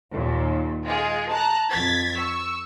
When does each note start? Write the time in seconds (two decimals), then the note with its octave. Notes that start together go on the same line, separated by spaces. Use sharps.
0.11 D#2 A#2
0.83 G#3 F4 G#4
1.29 A5 A#5 F#6
1.70 F2 G#6 A6 B6
2.16 C#6 E6